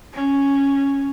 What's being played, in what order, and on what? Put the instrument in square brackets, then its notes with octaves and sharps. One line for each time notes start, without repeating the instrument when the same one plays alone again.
[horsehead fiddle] C#4